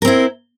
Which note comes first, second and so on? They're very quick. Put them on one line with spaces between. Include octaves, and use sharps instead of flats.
A#4 C4 E4